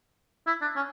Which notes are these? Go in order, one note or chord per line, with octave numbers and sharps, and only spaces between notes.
E4
D4
C#4